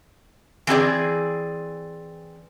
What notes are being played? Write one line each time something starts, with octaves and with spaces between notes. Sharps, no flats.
E3 C4 G#4 D5